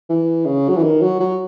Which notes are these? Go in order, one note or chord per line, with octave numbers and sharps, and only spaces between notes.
E3
C#3
F#3
E3
D#3
F#3
F#3